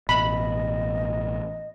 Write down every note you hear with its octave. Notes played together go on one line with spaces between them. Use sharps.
A1 B2 D#5 B5